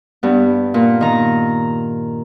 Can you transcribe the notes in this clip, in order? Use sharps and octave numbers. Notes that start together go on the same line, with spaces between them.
G2 B3
A#2
D#3 A#5